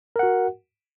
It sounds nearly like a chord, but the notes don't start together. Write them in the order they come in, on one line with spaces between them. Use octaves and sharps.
A#4 F#5 F#4